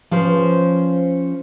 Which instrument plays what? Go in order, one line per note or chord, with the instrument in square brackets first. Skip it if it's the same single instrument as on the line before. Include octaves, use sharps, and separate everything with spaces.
[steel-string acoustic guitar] F3 C#4 C5